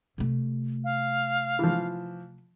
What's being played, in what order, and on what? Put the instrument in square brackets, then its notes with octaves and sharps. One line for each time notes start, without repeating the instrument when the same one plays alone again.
[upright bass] C3 A3
[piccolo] F5
[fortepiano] E3 F3